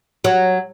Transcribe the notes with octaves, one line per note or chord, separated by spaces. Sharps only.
F#3